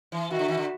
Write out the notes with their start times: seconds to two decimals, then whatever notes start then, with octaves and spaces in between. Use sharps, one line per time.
0.12 E3
0.30 D#3 F#4
0.39 D3
0.48 D#3
0.57 D3